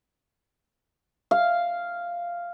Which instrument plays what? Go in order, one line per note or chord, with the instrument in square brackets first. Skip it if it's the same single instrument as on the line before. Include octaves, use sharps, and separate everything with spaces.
[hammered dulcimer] F5